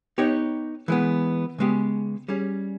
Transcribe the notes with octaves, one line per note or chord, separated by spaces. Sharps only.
B3 D#4 G4 C#5
E3 G#3 B3
C#3 G#3 B3 G4
G3 C#4 G#4